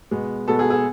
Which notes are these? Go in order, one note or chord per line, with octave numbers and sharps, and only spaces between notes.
B2 G#3 B3
B2 G#3 B3 A4
G#4
G#4